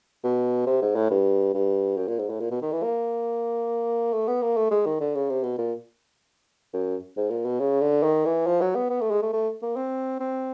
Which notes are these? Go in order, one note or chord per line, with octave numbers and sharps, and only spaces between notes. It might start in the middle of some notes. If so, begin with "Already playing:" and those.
B2
C3
G#2
A2
G2
G2
F#2
A#2
G#2
A2
A#2
B2
D#3
E3
A#3
A3
B3
A#3
A3
G#3
D#3
D3
C#3
C3
B2
A#2
F#2
G#2
A#2
B2
C#3
D3
D#3
E3
F3
F#3
B3
B3
A3
G#3
A3
A3
A#3
C4
C4